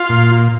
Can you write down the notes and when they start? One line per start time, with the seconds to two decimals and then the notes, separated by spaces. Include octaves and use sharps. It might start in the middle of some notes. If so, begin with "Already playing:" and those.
Already playing: F4 F5
0.09 A#2